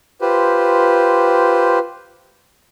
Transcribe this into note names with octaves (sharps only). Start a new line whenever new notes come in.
F4 G4 B4 C5